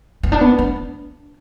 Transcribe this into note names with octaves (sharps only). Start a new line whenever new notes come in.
B3
D4
B3
D4